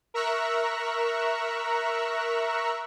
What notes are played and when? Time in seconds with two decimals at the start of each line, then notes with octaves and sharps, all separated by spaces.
0.14 A#4 E5 A#5 C#6 E6 F#6